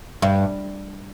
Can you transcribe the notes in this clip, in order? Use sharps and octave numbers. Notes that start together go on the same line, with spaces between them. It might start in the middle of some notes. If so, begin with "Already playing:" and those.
G2